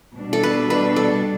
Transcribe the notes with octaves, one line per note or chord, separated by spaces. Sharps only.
B2 G3 D4
A4
B4
B4
A4